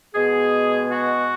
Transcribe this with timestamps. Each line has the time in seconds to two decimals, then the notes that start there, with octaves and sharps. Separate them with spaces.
0.14 B2 G#3 B3 G#4
0.91 F#4